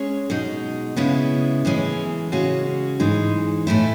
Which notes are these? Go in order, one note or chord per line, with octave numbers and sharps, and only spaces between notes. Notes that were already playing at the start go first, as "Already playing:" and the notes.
Already playing: G#3 C#4 G#4 C#5
B2 G#3 D#4
C#3 G#3 B3 E4
A2 E3 G#3 C#4
C#3 G#3 C#4 F#4
G#2 E3 G#3 D#4
A2 E3 A3 E4